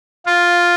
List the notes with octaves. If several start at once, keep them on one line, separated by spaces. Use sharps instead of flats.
F4